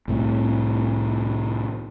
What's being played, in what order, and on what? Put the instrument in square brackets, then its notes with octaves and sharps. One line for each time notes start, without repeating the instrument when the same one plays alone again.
[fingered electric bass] C2 A2 C3